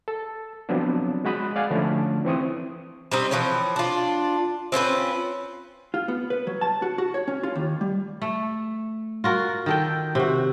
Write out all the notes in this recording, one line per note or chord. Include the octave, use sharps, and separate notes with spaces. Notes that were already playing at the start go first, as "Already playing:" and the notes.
A4
F3 F#3 B3 C4 D4
G#3 F#4 B5 D#6 F#6
D5 F5 F#5 G#5
D3 F3 A3 C#4 D4
E3 C4 C#6 D#6
G3 C4 D#4
E3 F3 C4 C#5
D4 F4
C4 C#4 F4 B4
F4
B3
B4
F#3
A5
F#4
F#4
C#5
C#4
F4
D#2
G3
A3
F4 F#4 A#4
D#3 A4 G5
C3 F#4